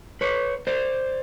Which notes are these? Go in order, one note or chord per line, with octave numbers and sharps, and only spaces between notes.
B4 C#5
C5 D5